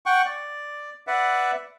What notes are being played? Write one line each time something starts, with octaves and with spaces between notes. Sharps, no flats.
F#5 G5 C#6
D5
B4 D5 E5 F#5